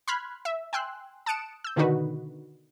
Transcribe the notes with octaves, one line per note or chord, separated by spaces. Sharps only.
B5 C6 F6 F#6 G#6
E5
G5 G#5 C6 E6 F#6
A5 D#6 F#6 C#7 D7 E7
E6 G6
B2 D3 D#3 D#4 F#4 B4